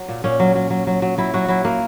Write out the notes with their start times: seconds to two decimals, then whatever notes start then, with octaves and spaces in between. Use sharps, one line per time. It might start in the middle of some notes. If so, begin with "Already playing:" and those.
Already playing: F#3
0.08 A#2
0.24 A#2 C#4
0.40 F#3
0.55 F#3
0.70 F#3
0.87 F#3
1.02 F#3
1.18 F#3 E4
1.34 F#3 F#4
1.48 F#3 E4
1.65 F#3 A#3